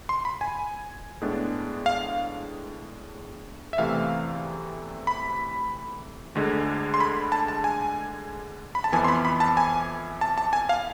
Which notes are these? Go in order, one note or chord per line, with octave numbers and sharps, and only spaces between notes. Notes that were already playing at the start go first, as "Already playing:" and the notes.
C6
B5
G#5
A2 G#3 B3 D4
F5
E5
E2 C3 E3 A3 C4 F5
B5
D2 D3 G#3
C6
B5
A5
A5
G#5
B5
A5
F2 E3 B3 G#5
C6
B5
B5
A5
G#5
A5
A5
G#5
F5